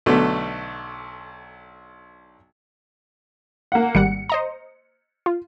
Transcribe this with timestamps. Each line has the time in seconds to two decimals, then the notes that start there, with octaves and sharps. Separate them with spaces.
0.06 B1 B2 D3 A3
3.72 A#3 F#5
3.95 G#1 G3 F#5 C#7
4.29 C5 D#5 A#5
5.26 F4